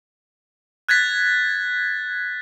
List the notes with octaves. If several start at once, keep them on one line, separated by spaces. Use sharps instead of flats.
F#6 G#6 A6 B6